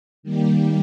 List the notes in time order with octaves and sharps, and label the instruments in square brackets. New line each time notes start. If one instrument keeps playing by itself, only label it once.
[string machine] D#3 G3 A#3 G4